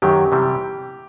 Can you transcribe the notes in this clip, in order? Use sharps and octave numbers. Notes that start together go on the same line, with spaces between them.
F#2 D#3 F#3 G4
C3 E3 G3